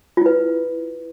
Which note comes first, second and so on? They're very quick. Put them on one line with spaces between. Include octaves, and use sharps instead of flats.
F4 E4 B4